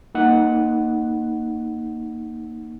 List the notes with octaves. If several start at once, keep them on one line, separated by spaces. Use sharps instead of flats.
A#3 D#4 F#5